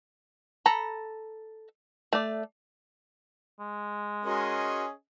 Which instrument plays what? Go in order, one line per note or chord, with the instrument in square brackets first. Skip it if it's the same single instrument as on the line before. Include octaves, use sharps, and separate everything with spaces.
[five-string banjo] A4 A#5 B5
A3 D5
[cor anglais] G#3
[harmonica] C#4 G#4 D#5 [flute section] F#4 A#4 C6